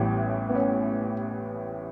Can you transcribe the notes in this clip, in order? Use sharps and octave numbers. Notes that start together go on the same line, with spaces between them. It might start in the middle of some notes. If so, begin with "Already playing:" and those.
Already playing: A1 A2 E3 G3 B3
B3
C#4